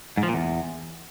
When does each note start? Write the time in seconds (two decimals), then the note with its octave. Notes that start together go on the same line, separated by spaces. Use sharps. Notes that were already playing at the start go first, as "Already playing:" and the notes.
0.17 G#2
0.23 F3
0.28 A#2
0.34 E2